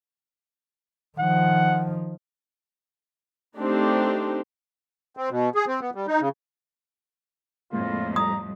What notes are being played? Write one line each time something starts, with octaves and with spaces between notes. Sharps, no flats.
D#3 F3 F#5
A3 C4 D4 D#4 G4
C4
B2
G#4
C4
B3
G3
D#4
C#3
F2 A2 G#3 A#3 F4
G3 A#5 D#6